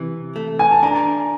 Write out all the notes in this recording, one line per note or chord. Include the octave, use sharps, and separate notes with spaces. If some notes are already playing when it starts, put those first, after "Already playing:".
Already playing: C3 E3
A3
G#5
A5
D4 A#5